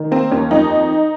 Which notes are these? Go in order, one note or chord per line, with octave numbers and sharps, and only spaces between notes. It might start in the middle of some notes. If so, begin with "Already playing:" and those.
Already playing: D#3
A#3 C4
D#2 C#4
F2 D#4